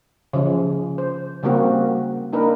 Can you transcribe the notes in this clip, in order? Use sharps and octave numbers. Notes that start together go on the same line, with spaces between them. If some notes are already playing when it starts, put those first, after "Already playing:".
C#3 F3
C5
C#3 G3 A#3 C4 F#4
A#3 D4 D#4 A#4 B4